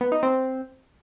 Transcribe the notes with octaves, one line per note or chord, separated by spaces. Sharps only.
B3
D#4
C4